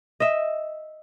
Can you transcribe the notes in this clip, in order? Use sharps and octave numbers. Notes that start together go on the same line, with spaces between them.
D#5 E5